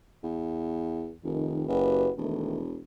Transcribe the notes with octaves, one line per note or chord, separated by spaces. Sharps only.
E2
F1 D#3
F#1 F#4 G4 B4
E1 D#3 E3 A3